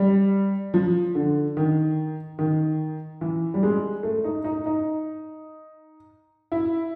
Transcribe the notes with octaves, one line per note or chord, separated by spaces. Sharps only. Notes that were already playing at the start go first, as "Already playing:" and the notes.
Already playing: G3
F3
D3
D#3
D#3
E3
G3
G#3
A3
D#4
D#4
D#4
E4